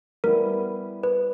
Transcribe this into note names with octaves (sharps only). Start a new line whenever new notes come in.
G3 B3 E4 A#4
B4